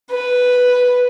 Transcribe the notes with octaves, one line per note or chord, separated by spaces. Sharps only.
B4